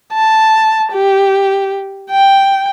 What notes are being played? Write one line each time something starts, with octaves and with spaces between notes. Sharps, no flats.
A5
G4
G5